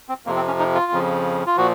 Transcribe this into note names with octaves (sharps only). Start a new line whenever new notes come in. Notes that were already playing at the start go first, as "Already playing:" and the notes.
C4
F2 C3 F3 A#3
C4
C#4
D#4
F4
F2 C#3 F3
F4
A#2 F3 F#4